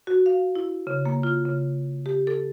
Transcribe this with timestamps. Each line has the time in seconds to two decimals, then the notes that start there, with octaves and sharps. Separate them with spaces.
0.07 F#4
0.26 F5
0.55 E4
0.87 C#3
1.06 A#3
1.23 F4
1.45 C#3
2.06 G4
2.27 A4